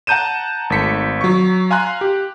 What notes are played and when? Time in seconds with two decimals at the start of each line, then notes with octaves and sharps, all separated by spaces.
0.07 F#5 A5 A#5 G6 D#7 E7
0.70 G#1 A3 B6 C#7
1.21 F#3 C#6
1.71 F5 G#5 A#5 C6 F#6
2.01 G4